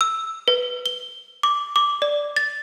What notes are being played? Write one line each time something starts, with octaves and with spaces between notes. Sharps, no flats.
E6
B4
G7
D6
D6
D5
A6